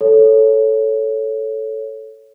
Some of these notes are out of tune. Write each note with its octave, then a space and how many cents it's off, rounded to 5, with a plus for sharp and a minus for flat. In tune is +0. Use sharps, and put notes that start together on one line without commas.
A4 +0 C#5 +0